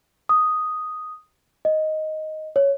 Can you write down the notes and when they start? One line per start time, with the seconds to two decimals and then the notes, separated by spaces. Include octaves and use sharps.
0.29 D#6
1.65 D#5
2.56 C#5